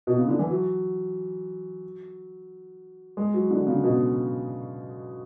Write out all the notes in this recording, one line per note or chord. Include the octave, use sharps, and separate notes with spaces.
B2
C#3
D3
E3
F#3
G#3
F#3
D3
C#3
B2